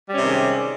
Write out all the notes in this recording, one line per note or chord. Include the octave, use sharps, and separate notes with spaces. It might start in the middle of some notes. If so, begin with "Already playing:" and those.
C3 D#3 G3 G#3 C#4